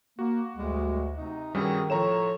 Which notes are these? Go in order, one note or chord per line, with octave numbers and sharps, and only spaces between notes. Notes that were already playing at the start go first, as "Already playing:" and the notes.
A#3 F#4
D2 A2 G3 G#3
C3 D#4
G2 D#3 G3 C#4 E4 F#4 G#4
A2 F3 C#5 A#5 E7